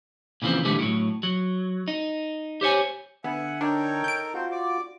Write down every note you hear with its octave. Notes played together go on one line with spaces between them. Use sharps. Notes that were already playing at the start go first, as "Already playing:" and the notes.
A#2 C#3 E3 F3 C4
G#2 B2 D3 E3 G3 A3
A2 F#3
F#3
D#4
G4 C5 C#5 G#5
D3 B3 E5 F#5 G#5
D4 D#4 A4 A#4 C#5 G5
G6 D7
C4 F4 F#4 C5
D5 D6